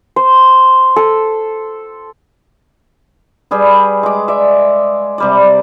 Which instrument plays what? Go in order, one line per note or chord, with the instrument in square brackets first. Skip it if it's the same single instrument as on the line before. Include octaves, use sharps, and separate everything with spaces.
[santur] C5
A4
[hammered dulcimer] G3 G#4 B4
G#3 D6
D5 E5
C3 G3 D5